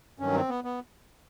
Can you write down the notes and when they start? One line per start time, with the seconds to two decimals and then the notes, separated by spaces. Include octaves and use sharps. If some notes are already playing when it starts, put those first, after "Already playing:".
0.19 G2 D#3 F#3 C#4
0.34 C4
0.49 B3
0.64 B3